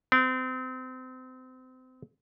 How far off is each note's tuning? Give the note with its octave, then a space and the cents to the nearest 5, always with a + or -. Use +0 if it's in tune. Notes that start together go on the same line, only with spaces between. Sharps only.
C4 -30